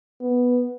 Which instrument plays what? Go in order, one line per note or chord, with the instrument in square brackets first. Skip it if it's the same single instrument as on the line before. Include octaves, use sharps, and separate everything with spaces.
[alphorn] B3